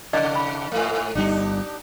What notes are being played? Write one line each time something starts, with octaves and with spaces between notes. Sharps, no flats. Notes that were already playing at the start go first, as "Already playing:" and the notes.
C3 D5 D#5
B5
G#2 A3
G1 G3 D4 D#4 G4